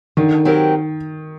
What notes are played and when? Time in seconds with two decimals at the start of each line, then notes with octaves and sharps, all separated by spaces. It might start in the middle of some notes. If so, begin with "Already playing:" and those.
0.17 D3 D#3
0.45 F#3 C4 G4 A#4